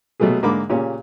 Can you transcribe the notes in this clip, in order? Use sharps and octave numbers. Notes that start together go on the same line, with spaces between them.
B2 F#3 A3 G4 G#4
G#2 D3 A#3 B5 D6
A#2 C#3 C#4 G4